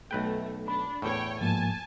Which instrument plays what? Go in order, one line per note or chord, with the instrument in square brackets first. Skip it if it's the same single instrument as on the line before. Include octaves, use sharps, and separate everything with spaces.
[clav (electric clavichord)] B1 B4 G5 [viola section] A3
[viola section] D4 [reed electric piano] B5
[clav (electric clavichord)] E2 A2 [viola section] C#5 G5
[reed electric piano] G#2 F3 A#3 [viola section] G#5 A5